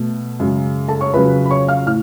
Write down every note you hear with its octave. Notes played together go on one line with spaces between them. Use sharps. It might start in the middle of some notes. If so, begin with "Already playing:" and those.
Already playing: B2 A3
F#2 C#3 G#3
A4 A5
C#5 C#6
F2 C#3 F#3 B4 B5
B5
C#5 C#6
F5 F6
A2 F6